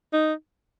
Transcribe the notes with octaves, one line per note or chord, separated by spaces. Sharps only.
D#4